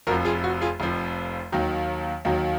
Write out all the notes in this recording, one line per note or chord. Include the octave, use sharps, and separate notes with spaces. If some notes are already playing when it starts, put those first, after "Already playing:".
F1 F2 F3 F#4 A#4
F4 G#4
F#4
F4 G#4
F1 F2 F3
D#2 D#3 F#3
D#2 D#3 F#3